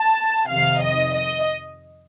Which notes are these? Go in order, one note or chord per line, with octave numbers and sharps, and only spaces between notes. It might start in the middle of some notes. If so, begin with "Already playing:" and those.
Already playing: A5
F2 C3 D#3 F5
D#5
D#5